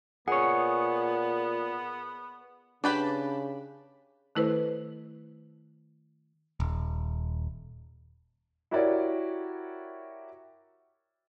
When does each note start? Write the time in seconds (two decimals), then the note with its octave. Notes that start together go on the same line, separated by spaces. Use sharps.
0.28 A#2 B3 G#4 C#5 F#5
2.84 C#3 D4 G4 B4 D5 A5 B5
4.35 D#3 A3 E4 A4 B4 C5
6.60 D#1
8.71 E4 F#4 G4 A#4 C#5 D5